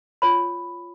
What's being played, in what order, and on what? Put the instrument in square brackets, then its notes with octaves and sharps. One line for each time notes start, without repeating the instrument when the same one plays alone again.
[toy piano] F4 C#5 B5